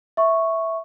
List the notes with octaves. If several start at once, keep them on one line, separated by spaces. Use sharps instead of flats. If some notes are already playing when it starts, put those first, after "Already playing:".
E5 C#6